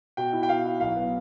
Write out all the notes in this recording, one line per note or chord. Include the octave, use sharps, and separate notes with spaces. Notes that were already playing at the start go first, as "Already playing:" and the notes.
B2 G5
E4
G5
B2 F5
E4
B1 F5
B3